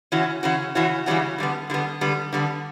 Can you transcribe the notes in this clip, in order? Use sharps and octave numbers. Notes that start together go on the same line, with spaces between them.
C#3 E3 C#4 F#4
C#3 E3 C#4 F#4
C#3 E3 C#4 F#4
C#3 E3 G3 C#4 F#4
D3 G3 B3
D3 G3 B3
D3 G3 B3
D3 G3 B3